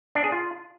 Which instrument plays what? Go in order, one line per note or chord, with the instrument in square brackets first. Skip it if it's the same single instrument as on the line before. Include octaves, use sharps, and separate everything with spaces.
[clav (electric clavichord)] D4
G#4
F4